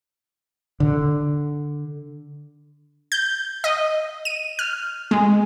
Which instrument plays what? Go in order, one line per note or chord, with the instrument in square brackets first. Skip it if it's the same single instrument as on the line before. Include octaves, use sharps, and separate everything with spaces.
[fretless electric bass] D3
[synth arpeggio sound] G6
D#5
D#7
F6
G#3